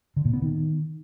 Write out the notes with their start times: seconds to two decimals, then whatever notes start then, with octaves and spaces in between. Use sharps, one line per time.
0.16 D3
0.25 A#2
0.33 B3
0.42 D#3